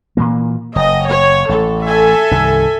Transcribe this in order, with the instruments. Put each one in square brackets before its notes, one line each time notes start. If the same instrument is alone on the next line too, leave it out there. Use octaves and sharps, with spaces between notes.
[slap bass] A#2 E3 A#3
[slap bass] F#1 [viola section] D#5
[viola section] C#5
[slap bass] A1 [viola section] A4
[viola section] A4 E5 G#5
[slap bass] C2 G2 D#3